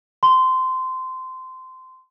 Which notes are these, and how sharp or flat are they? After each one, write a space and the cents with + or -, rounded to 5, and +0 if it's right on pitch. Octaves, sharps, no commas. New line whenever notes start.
C6 -20